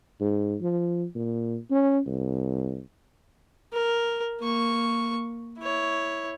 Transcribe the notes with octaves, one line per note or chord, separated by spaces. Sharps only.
G#2
F3
A#2
C#4
C2
A#4
A#3 C#6
E4 C#5